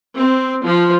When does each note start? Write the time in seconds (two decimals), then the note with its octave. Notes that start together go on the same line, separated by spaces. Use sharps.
0.16 C4
0.63 F3